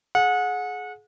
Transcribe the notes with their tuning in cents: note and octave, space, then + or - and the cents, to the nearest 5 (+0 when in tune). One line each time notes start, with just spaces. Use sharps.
G#4 +30 F#5 -30